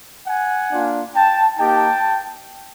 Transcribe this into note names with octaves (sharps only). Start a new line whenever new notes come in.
F#5 G#5
A#3 D4 F4
G5 A5
A#3 D#4 G4 G5 A5